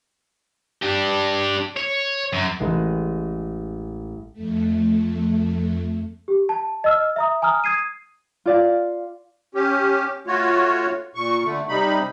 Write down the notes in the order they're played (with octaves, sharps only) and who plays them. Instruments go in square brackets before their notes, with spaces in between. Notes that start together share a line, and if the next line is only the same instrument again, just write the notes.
[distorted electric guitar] D4 G4
C#5
F#2
[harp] A1 A2 G#3 F#6
[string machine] F2 A3
[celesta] G4
A5
D#5 E6 F6
E5 A#5 D#6
G#5 A#5 D#6 F6
D#6 G#6 C7 D#7
[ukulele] F4 D5 F5
[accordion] C#4 G4
A3 F4 F#4 C#5
A#2 C#6
D3 A3
C3 G3 D#4 B5